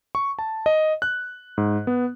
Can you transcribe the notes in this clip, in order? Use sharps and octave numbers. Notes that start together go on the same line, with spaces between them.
C#6
A5
D#5
F#6
G#2
B3